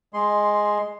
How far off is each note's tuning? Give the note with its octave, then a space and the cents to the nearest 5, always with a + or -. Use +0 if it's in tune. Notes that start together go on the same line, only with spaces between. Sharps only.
G#3 +0 C6 +0